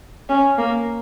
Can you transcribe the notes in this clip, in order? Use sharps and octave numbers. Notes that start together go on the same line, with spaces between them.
C#4
A#3